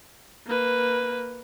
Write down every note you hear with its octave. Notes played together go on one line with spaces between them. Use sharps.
A#3 B4